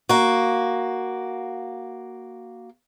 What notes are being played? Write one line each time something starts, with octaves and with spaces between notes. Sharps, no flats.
A#3 F#4